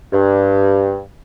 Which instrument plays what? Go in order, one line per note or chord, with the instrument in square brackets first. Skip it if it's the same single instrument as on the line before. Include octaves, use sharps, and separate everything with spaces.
[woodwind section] G2